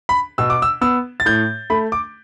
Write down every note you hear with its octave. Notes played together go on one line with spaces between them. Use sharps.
B5
B2 E6
D6
E6
B3 E6
A6
A2 G6
A3 B5
D6